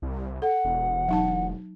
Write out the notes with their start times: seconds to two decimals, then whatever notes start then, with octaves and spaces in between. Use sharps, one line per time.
0.02 C2
0.42 A4 F#5
0.64 E1
1.09 F#3 D#4 A5